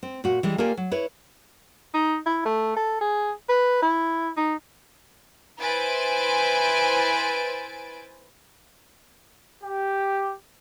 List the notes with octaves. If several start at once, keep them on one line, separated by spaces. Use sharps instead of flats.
C4
A#2 F#4
E3 G3 G#3
A#3 F4 G4 A4 D5 G#5
F#3
E4 B4 C#5
D#4
E4
A3
A4
G#4
B4
E4
D#4
E4 B4 C5 G#5 A6 D7
G4